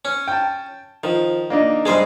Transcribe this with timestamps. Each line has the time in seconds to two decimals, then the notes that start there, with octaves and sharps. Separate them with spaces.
0.05 C#4
0.28 G5 A5
1.04 D#3 F3
1.50 A#3 D4 D#4
1.86 G2 G#3 G#4 C5 D#5